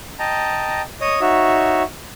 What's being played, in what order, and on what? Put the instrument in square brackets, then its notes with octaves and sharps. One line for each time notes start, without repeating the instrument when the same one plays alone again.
[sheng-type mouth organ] D#5 G5 A5 A#5
C#5 D#5 D#6
D#4 F#4 C#5 E5